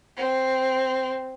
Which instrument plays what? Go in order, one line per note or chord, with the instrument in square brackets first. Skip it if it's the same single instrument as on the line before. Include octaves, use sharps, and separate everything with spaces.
[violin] C4